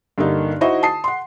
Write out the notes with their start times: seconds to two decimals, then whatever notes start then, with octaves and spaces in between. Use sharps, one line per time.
0.18 G2 D3 A#3 D#4
0.61 D#4 E4 F#4 C5 D#5 C#6
0.83 A5 D#6 C7
1.04 F#5 C6